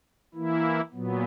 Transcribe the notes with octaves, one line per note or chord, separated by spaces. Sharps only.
E3 A#3 E4
A#2 F#3 B3